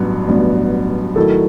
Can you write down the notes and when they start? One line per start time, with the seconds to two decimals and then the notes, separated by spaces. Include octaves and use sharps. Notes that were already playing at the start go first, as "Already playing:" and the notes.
Already playing: A1 G2 F#3 B3
0.28 A1 G2 F#3 B3
1.16 D#3 F#3 A3 E4 A4